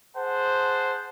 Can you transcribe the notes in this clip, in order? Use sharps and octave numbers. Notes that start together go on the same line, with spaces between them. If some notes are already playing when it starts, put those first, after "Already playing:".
G#4 C5 F#5 A5